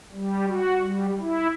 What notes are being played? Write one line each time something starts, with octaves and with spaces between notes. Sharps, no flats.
G3
F#4
G3
E4